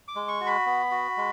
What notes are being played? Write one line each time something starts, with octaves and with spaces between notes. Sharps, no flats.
D6
G#3
C#6
F#4
B5
B3
F#4
G#3